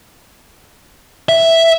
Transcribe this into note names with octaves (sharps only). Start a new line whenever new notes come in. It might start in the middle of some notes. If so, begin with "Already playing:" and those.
E5